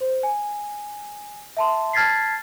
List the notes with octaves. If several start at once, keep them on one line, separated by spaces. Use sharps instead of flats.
C5
G#5
E5 A5 C6
A5 F6 G#6 A6 B6 C7